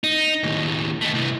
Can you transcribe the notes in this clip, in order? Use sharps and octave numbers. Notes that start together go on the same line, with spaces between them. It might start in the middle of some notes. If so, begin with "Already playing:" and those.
D#4
D#2 A2
A3 D#4
C2 E3